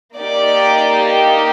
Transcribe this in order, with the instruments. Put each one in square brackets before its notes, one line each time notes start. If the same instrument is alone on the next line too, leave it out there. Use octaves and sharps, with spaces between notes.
[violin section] A#3 D#4 G4 D5